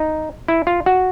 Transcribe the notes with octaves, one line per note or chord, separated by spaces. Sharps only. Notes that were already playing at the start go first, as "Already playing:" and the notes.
Already playing: D#4
E4
F4
F#4